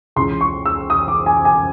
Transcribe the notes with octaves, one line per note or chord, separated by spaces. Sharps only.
C#2 C#3 E3 C6
C#6
E6
D#6
D6
G#5
G#5